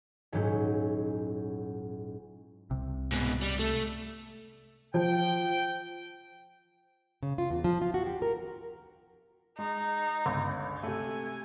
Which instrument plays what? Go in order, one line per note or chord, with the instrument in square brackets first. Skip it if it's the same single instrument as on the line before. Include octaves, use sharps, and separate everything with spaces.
[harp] D#1 G#2 F#3 C#4 E4 G6
[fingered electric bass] C2 C3
[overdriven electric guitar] G#2 B2
G3
A3
[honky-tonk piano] F3 [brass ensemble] G5
[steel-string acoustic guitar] C#3
F4
E2
F3
F4
F#4
G4
A#4
[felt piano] G#3 [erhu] D#4
[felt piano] G1 C#2
[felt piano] C3 A3 [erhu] G#5